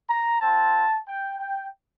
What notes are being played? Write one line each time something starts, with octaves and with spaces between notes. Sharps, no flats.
A#5
C4 F4 A5
G5
G5